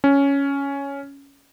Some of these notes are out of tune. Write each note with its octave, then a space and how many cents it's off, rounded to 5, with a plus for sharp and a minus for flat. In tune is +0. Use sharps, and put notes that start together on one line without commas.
C#4 +5